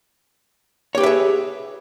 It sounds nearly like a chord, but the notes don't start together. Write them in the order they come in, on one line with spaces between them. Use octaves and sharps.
C#5 G4 B4 E5 G#4